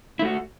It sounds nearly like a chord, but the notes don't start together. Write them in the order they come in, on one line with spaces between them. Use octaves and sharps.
E4 A3 F#4